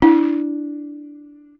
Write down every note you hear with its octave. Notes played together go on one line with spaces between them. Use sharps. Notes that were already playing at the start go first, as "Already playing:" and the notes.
D4 E4